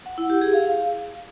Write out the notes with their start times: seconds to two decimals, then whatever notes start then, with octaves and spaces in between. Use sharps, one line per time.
0.06 F#5
0.18 E4
0.30 G4
0.41 G#4
0.53 F5